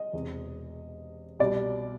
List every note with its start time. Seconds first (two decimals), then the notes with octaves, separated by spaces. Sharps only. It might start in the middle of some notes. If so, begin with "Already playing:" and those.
Already playing: D#5
0.13 E1 E2 C3
1.39 C2 B2 G3 D5